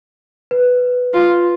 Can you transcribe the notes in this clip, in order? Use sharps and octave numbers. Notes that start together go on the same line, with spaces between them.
B4
F4